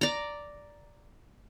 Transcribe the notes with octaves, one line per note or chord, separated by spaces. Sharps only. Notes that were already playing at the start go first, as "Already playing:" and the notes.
D5 A#5